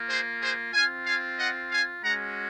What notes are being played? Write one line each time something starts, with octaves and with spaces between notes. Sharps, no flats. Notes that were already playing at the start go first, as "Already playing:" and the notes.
Already playing: A#3 F4
G#4 C5
G#4 C5
C4 F4 F5 G#5
F5 G#5
D#5 F#5
F5 G#5
G#3 C#4 F#4 F#5 A#5